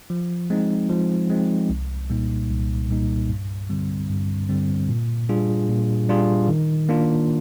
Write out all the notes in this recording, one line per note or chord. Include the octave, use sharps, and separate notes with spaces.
F3
G#3 C4 D#4
F3
G#3 C4 D#4
C2
A#2 G3 A#3 D#4
C2
A#2 G3 A#3 D#4
G2
D3 G3 C4
G2
D3 G3 C4
A#2
G3 D4 F4 G#4
A#2
G3 D4 F4 G#4
D#3
A#3 D4 F4